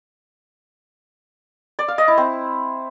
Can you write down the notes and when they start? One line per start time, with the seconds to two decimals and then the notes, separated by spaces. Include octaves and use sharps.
1.79 D5
1.88 F5
1.98 D#5
2.08 E4
2.17 C4